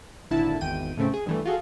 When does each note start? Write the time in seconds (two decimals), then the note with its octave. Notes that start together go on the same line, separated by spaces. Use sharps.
0.31 G#1 A#2 D3 E4 A5
0.61 G#1 E2 G5 D#7
0.97 A2 C#3 A3 C4
1.14 G#4
1.26 G2 E3 A3
1.45 F4 F#4 G#4 A4